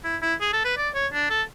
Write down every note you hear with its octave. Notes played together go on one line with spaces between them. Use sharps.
E4
E4
G#4
A4
B4
D5
C#5
D4
A4